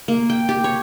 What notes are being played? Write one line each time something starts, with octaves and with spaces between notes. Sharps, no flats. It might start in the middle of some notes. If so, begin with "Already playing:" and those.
A#3
G5
G4
C#5